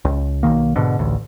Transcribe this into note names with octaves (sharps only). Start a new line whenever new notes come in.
C#2
B1 F2 D#3 A#3
G#2 B2 D3
A1 D2